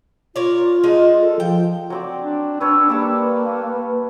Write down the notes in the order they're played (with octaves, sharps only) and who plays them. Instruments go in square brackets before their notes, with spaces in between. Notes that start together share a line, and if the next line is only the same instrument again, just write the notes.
[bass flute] F4 [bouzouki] A#4 C#5 D5
[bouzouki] G#3 D4 D#4
[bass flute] A4
[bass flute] F3 [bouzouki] G5
[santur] F#3 C4 D5
[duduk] D4
[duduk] D4 [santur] B4 C#5 [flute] E6
[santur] G3 A4 A5 [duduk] A#3
[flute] B4